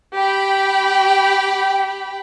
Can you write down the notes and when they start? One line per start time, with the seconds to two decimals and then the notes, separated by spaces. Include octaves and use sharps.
0.17 G4 G5 B5